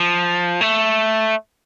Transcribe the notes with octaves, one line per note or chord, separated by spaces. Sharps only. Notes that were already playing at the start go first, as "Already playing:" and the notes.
Already playing: F3
A3